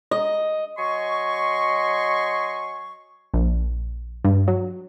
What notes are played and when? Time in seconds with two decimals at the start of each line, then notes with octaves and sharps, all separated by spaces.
0.11 D#5
0.78 F#3 D#5 G#5 C6 C#6
3.34 A#1
4.25 G2
4.48 F#3